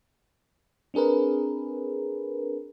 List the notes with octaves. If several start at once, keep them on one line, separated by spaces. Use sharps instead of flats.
C4 D4 G#4 A#4 B4